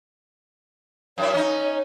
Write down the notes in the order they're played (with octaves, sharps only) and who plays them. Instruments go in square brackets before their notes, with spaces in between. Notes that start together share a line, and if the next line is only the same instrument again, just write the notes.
[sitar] F#2 E4 [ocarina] C#5
[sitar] C#4 D#4